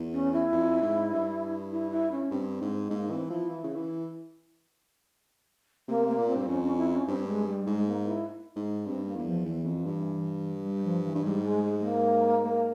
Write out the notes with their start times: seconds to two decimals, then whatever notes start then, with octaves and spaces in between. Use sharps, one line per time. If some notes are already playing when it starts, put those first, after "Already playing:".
Already playing: E2
0.13 C#4
0.33 E4
0.52 F2
0.82 G#2
1.11 G2
1.72 E4
1.91 E4
2.11 C#4
2.31 G2 C4
2.61 G#2
2.90 G#2 A#3
3.10 E3 C4
3.30 F3 E4
3.49 E3
3.63 C#3
3.76 E3
5.88 C3 A#3
6.08 A#3
6.18 A#2
6.28 C4
6.35 G2
6.47 F2 C#4
6.63 C#4
6.77 E4
6.92 C#4
7.07 G2 C4
7.27 G#3
7.47 G3
7.66 G#2 G#3
7.86 A#3
8.07 E4
8.56 G#2
8.86 G2 C4
9.06 A#3
9.16 E2
9.25 F3
9.45 E2 E3
9.65 F2
9.86 G2
10.64 G3
10.84 F3
11.04 E3
11.15 G2
11.24 G#2 G3
11.44 G#3
11.64 G#3
11.79 G#3
11.84 A#3
12.43 A#3